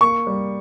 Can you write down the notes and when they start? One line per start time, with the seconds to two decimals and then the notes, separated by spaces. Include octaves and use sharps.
0.01 A#3 C#6
0.27 G3